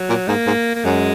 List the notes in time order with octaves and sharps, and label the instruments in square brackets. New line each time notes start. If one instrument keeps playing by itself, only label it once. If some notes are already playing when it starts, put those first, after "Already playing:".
Already playing: [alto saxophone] F#3
[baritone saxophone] A#2
[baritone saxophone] G#2 [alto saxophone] A#3
[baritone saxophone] G#2
[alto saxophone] A#3
[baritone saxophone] F#2 [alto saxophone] G#3